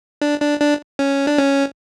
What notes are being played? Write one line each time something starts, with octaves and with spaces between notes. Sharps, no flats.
D4
D4
D4
C#4
D4
C#4